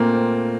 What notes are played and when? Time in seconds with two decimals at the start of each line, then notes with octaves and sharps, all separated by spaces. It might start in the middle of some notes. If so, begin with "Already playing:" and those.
Already playing: A#2 A3 A#3 C4 F4
0.15 C4